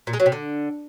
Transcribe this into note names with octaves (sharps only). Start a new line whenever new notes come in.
A#2
G#3
F#3
C3
D3